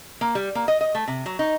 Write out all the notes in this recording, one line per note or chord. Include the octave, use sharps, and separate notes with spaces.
A#3
G3
A#3
D#5
D#5
A3
C3
F#3
D#4